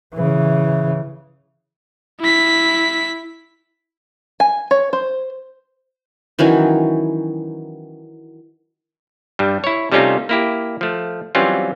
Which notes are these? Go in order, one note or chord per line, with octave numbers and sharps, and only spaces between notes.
C#3 E3
E4 B6
G#5
C#5
C5
D#3 E3 F#3 C#4
G2 G3
E4 C#5
C3 G3 A3 C#4 D#4 F4
A#3 E4 G4
F3 A3
E3 F#3 G3 C4 C#4 F4